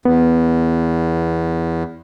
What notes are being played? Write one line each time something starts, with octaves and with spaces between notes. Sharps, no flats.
E2 B3